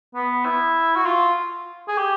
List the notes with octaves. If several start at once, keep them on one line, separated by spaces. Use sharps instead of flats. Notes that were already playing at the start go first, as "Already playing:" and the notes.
B3
E4
F#4
F4
G#4
G4